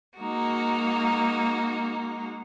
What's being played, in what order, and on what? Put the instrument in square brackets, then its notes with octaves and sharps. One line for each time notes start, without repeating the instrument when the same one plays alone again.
[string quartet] G#3 A#3 D#4 F#4